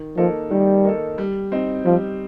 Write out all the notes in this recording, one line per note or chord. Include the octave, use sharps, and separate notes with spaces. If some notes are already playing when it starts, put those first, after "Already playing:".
Already playing: D#3
F3 A#3 D#4 A4
D#3 G3
A#3 D#4 A4
G3
C4 D#4
F3 G3